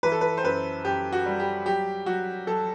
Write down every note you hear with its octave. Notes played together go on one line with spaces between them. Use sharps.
E3 B4
A4
B4
C5
F#2 B4
F#2 G4
F#4
G3
G4
F#3 G4
F#3 F#4
F#3 A4